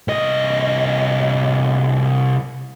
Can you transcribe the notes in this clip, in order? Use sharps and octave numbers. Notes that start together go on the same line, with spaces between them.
C2 D#5